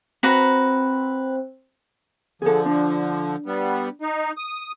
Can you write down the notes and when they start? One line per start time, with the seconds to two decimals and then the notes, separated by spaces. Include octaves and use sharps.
0.23 C4 F#4 B4 A#5
2.42 D3 F3 G#4 A4
2.66 D4
3.46 G3 B3
4.02 D#4
4.37 D#6